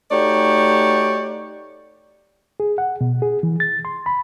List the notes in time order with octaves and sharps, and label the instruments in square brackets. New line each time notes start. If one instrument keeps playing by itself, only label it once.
[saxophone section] A3 D#4 F#4 G4 C#5 D5
[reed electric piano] G#4
F#5
B2
G#4
E3
A6
C6
B5